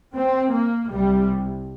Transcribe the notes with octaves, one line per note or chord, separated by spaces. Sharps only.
C4
A#3
C2 C3 G3